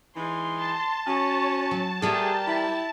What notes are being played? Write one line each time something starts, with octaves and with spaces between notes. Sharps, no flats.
E3 G#3 D#4 C6
A5
C#4 F#4 C#5
F#3
G3 A3 G4 G#4 A#4
E4